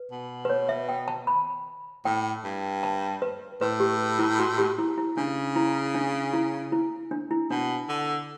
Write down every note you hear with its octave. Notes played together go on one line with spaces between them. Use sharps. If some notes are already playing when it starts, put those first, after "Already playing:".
Already playing: B4
B2
B4
C#5
E5
G5
A5
B5
A2 G5
G2
A5
B4
A2 B4
G4
E4
F#4
G4
E4
E4
C#3 D4
E4
D4
E4
E4
D4
E4
B2 D4
D3